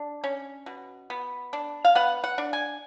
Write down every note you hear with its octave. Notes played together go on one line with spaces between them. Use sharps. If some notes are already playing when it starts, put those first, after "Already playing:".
Already playing: D4
C#4
B2
B3
D4
F5
B3 F#5
F#5
D4
G#5